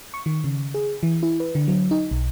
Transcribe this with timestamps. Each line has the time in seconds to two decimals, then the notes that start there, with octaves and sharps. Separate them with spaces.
0.14 C#6
0.26 D#3
0.44 C#3
0.74 G#4
1.03 E3
1.23 E4
1.40 B4
1.55 D3
1.68 F#3
1.91 D#4
2.11 B1